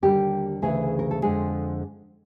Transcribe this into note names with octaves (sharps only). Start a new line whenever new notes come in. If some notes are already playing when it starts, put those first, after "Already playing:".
D#2 D3 G3 G4
D2 C#3 E3 A3 G#4
A#4
A4
F2 D3 F3 G#3 G#4